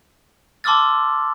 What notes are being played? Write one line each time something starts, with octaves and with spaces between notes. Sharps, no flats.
A5 C6 D6 E6 F6 A6